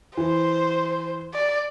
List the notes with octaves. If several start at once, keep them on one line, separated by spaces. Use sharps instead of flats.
E3 C5
D5